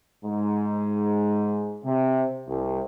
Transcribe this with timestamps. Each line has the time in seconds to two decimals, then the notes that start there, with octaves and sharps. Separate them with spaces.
0.24 G#2
1.84 C3
2.48 C2